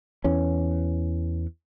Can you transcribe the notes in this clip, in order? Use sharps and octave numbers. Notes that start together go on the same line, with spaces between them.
E2 E3 C#4